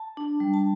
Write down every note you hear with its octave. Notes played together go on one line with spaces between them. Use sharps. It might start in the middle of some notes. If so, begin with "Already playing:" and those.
Already playing: A5
D4
G3
A5